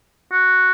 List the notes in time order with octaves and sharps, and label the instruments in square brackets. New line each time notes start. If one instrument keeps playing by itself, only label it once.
[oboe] F#4